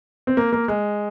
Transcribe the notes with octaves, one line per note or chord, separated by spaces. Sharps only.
C4
A#3
A#3
G#3